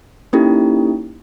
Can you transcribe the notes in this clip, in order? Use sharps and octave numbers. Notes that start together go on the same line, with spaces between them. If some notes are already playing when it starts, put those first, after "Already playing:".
A#3 C#4 D#4 E4 G4 A4